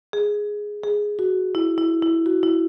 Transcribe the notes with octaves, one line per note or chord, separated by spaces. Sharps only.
G#4
G#4
F#4
E4
E4
E4
F#4
E4